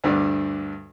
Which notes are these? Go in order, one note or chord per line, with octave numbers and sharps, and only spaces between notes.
D2 G2 D3 D4 D5